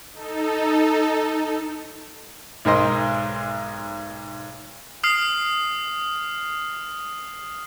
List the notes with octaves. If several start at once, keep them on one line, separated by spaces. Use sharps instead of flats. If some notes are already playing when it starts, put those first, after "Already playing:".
D#4 A4
B1 G#2 A#4 C5 D#5 C6
D#6 F6 C7